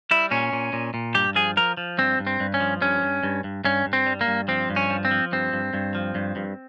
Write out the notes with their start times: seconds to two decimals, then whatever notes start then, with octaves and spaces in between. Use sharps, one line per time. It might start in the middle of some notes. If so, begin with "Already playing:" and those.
0.11 G3 E4
0.31 A#2 C#4
0.53 A#2
0.73 A#2
0.94 A#2
1.15 G2 G4
1.35 F3 G#4
1.57 F3 A#4
1.77 F3
1.98 G2 C4
2.19 G2
2.27 C4
2.40 G2
2.54 C#4
2.60 F3
2.81 G2 C#4
3.03 G2
3.23 G2
3.44 G2
3.64 G2 C#4
3.86 G2
3.93 C4
4.06 G3
4.21 A#3
4.28 G2
4.48 F3 C4
4.70 G2
4.76 C#4
4.90 F3
5.05 C4
5.11 F3
5.32 G2 C4
5.53 G2
5.74 G2
5.95 F3
6.15 G2
6.36 G2